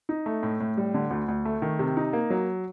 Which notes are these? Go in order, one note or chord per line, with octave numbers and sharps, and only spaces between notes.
D#4
A3
A2
A2
G3
D3
D2
D2
A3
D#3
C3
D#4
A#3
F#3